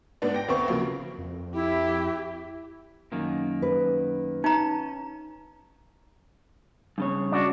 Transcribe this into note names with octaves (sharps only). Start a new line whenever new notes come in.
G#2 B3 D4
G5 A#6
D2 B3 C4 C#6
C#3 F3 F#3 A#3
F2
E4 G4
F#2 D#3 A#3
B4
C#4 D#4 A#5
G2 C#3 C#5
D4 F#4